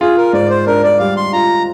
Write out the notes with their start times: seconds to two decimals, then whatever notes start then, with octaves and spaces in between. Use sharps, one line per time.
0.01 F4 G#4
0.17 A#4
0.33 G#2 D5
0.50 C5
0.67 D4 A#4
0.83 D5
0.99 G3 F5
1.17 C6
1.33 F4 A#5